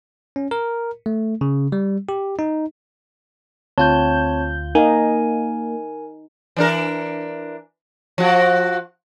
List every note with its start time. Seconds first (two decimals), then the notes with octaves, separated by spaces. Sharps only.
0.36 C#4
0.51 A#4
1.06 A3
1.41 C#3
1.72 G3
2.09 G4
2.39 D#4
3.78 D2 C4 F4 C#5 A5 G6
4.75 A#3 D#4 A#4 G#5
6.56 E3 D4 A#4
8.18 F3 F#4